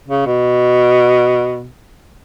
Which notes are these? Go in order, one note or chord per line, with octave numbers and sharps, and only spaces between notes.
C#3
B2